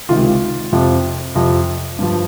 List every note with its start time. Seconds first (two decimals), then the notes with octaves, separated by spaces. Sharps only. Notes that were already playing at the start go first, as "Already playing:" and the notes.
0.09 C#2 C3 D#3 F4
0.73 F2 C3 F3
1.35 F2 C3 F3
1.99 G2 F3